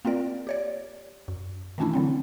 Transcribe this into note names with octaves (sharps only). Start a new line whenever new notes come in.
A#3 C4 F4 A#4 D5
G4 C#5 D5
F#2
D#3 E3 A3 C#4 D4 E4
D3 F#3 C4